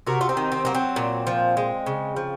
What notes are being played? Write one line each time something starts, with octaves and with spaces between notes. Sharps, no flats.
C3 F#4 A#4
F4
C4 D#4
D#3
C4
F#3 A#3
C4
A#2
F3
G#3
C#3
F3